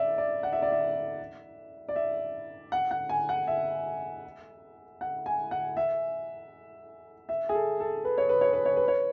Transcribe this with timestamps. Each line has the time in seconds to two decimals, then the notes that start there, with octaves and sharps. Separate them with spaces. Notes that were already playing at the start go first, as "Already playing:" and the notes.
Already playing: D5 E5
0.18 D5
0.43 F#5
0.53 E5
0.62 D5
0.72 E5
1.89 D5
1.96 E5
2.72 F#5
2.91 F#5
3.09 G#5
3.29 F#5
3.47 E5
5.01 F#5
5.26 G#5
5.51 F#5
5.77 E5
7.29 E5
7.49 G#4
7.54 A4
7.80 A4
8.05 B4
8.18 C#5
8.29 B4
8.41 C#5
8.53 B4
8.65 C#5
8.77 B4
8.88 C#5